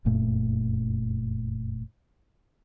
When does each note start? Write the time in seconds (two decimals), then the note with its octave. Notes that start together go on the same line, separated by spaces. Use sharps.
0.05 F1 F#2 A#2 A3